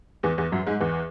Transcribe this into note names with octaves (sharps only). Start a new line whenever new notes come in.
E2 E3
E2 E3
F#2 F#3
G#2 G#3
E2 E3